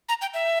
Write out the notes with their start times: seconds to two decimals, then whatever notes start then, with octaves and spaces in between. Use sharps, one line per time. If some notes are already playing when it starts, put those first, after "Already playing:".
0.09 A#5
0.21 G5
0.34 E5